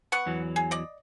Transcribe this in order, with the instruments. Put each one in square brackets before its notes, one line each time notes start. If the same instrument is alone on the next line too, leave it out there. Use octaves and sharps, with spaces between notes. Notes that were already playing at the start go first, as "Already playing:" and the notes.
[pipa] B3 F#5 C#6
[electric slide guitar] E2 E3 F#3
[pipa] G#4
D5 D#5